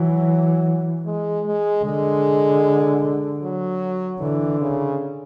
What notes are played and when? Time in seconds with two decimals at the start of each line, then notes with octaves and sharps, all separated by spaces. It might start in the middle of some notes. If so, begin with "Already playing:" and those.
Already playing: E3 F#3
1.05 G#3
1.46 G#3
1.84 D3 G#3
3.43 F#3
4.20 D3 E3
4.60 C#3